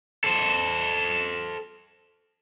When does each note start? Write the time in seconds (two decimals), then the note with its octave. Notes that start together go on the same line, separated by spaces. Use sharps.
0.24 A4 C5